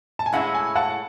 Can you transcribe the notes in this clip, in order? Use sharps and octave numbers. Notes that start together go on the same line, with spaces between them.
A5
G#5
A2 G#3 C#4 E4 F#5
G#5
F#5 A5